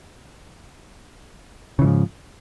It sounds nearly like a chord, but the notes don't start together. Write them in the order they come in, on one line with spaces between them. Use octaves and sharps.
C#3 E3 G#2 F3